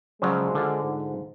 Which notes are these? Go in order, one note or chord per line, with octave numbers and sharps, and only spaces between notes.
C#3 F3 F#3 G#3 C5 D5 F#5
D3 F4
G#2